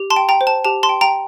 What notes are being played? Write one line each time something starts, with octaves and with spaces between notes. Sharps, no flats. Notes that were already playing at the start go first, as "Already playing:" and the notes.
Already playing: G4
A5 C6
G5
G5 A#5
C5
A5
G4 A5
A5 C6
G5
G5 A#5